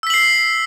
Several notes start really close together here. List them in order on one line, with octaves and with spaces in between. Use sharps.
E6 B6 F#7 C7